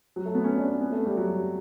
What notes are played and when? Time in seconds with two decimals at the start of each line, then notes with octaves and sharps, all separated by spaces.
0.16 F#3
0.26 A3
0.35 B3
0.44 C#4
0.57 D4
0.68 C#4
0.81 B3
0.92 A3
1.05 G3
1.17 F#3